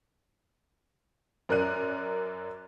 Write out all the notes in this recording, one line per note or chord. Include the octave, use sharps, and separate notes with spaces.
F#2 A#4 D5 F#6 D#7